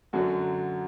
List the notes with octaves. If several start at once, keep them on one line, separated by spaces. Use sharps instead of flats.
F#2 D3 F#3 F#4